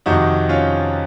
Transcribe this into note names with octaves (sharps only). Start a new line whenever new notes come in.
F2 C3 D#3 D#4 F#4
C#4 F4